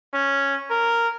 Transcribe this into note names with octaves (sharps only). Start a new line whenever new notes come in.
C#4
A#4